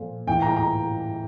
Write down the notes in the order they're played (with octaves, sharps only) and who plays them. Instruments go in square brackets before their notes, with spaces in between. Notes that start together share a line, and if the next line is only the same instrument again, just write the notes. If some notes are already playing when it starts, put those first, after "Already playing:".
Already playing: [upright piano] A#2 F3 A#3 F4 A4
[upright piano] A2 E3 A#3 [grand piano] G5
[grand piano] A#5
A#5